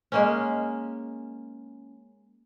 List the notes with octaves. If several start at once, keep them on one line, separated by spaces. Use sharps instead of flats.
G#3 A#3 C#4